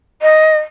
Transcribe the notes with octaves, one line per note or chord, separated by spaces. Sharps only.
D#5